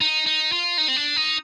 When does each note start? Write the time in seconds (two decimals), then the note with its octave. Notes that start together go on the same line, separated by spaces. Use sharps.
0.01 D#4
0.26 D#4
0.52 F4
0.78 D#4
0.88 C4
0.97 D4
1.16 D#4